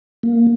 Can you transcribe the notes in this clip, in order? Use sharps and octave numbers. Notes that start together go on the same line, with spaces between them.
A#3